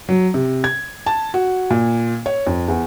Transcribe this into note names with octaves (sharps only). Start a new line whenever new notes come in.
F#3
C3
G#6
A5
F#4
A#2
C#5
F2
E2